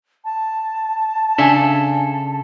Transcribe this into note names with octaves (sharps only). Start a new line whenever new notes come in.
A5
C#3 D4 A4 E5 G#5